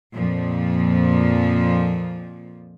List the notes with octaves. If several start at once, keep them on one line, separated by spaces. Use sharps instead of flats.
F2 A#2 F3